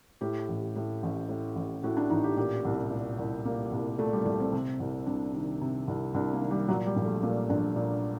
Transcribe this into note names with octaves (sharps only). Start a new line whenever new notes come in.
A2 G4
A1
A2
A1
A2
A1
A2 F#4
D4
A1 D#4
G4
A#2 G4
C2
A#2
C2
A#2 A#3
C2
A#2 A3
G3
C2 A3
C4
C3
C2
C2 D4
D#3
C3
C2
C2 D4
A#3
D#3
G3
A#2 F#3
G3
A#1
A3
A#2 A#3
A#1 D4
A#2